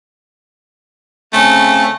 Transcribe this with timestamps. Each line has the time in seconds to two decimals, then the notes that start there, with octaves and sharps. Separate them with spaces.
1.33 C#3 A3 C4 C#4